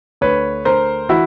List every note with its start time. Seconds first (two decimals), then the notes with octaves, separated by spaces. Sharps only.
0.21 D2 B4 C#5
0.65 D2 A#4 C5
1.09 E3 E4 F#4